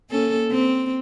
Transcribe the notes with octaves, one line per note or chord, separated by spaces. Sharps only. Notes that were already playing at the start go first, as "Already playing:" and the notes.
A#3 C#4 A4
C4